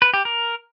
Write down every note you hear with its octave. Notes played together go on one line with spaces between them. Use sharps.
B4
G4
A#4